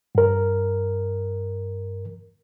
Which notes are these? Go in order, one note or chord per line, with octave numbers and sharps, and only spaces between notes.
G2 A#4